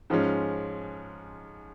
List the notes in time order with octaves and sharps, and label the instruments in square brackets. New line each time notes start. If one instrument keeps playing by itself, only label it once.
[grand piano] G#2 F3 G#3 C#4